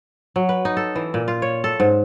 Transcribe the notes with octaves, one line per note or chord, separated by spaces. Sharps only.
F#3
B4
D#4
A4
E3
A#2
F4
C#5
A4
G#2